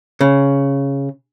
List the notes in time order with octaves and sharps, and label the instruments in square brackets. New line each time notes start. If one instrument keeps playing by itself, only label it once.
[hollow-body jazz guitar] C#3